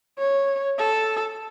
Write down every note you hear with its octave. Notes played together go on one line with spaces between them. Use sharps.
C#5
A4